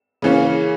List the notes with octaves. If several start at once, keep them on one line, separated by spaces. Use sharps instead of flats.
C#3 E3 A#3 C#4